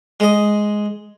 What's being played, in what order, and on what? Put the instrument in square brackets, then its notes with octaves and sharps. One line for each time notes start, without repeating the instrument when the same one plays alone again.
[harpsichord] G#3 D#5